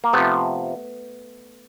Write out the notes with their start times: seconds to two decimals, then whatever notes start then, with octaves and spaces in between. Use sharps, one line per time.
0.04 A#3
0.13 C3 F3 A3 B3